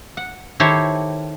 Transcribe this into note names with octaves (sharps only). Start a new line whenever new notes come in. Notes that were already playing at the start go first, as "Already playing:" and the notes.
F#5
D#3 E4 G4 A4 C5 C#5